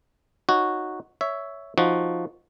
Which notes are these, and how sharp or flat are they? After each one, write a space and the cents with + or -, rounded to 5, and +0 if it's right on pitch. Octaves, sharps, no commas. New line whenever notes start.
D#4 +0 F#4 -5 C#5 +0
C#5 +10 E5 +0
F3 +0 D#4 +0 F#4 +0